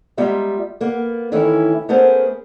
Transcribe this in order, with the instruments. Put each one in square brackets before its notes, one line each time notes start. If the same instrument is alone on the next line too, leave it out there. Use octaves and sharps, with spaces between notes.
[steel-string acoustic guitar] G3 G#3 B3 F4 E5 A#5
A#3 B3
D#3 E3 A3 C#4 E4
A3 B3 C#4 G#4 A#4 C5